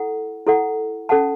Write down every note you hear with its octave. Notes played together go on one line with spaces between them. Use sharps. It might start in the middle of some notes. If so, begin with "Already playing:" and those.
Already playing: E4 A4 F#5
E4 A4 F#5
C#4 A4 F#5 A5